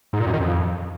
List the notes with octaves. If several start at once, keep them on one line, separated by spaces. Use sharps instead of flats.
G#2
A#2
F#2
D#3
F2